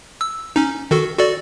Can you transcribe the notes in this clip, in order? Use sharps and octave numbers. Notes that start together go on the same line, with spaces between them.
E6
C#4 D#4
D#3 F#4 A4
F#4 A4 D5